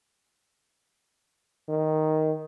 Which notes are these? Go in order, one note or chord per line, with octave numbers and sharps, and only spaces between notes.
D#3